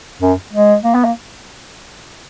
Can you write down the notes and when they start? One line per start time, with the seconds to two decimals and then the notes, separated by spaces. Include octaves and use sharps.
0.22 F#2
0.53 G#3
0.84 A#3
0.94 B3
1.04 A#3